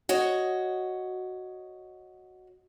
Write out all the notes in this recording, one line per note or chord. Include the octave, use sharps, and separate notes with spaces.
F#4 C#5 D#5